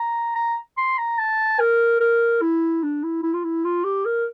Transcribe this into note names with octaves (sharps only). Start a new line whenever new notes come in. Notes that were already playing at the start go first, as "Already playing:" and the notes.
Already playing: A#5
A#5
C6
A#5
A5
A#4
A#4
E4
D4
E4
E4
F4
E4
F4
G4
A#4